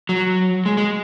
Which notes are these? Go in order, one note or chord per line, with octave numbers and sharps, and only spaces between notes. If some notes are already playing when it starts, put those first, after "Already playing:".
F#3
G#3
G#3